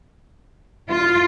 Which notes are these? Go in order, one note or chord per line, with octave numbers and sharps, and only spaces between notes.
F4